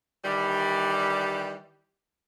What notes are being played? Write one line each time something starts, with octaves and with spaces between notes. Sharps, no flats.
D#3 E3 G3